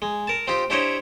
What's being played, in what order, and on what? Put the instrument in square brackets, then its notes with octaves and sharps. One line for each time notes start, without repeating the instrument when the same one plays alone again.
[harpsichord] G#3
A#4 A5
C4 D#4 F4 G4
D4 E4 G4 C5 C#5 D#5